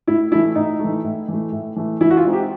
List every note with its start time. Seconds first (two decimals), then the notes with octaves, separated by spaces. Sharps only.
0.08 A2 E4
0.32 E3 A3 E4
0.55 A2 D#4
0.79 E3 A3
1.04 A2
1.28 E3 A3
1.52 A2
1.76 E3 A3
2.01 E3 E4
2.10 F#4
2.17 F4
2.25 G#3 C4 D#4
2.33 G4